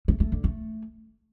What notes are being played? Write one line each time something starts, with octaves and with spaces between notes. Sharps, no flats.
A3
A3
D3
A3